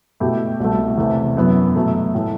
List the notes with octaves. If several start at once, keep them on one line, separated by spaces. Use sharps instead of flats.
B2 A3 E4 G4
C2 B2 A3
E2 C3 E3 A3
F#2 E3 B3
B2 F#3 A3
A2 E3 A3